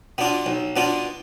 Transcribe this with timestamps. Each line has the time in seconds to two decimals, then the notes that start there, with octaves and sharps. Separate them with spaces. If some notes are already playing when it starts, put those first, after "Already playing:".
0.18 B2 B3 D4 F4
0.46 B1
0.76 B2 B3 D4 F4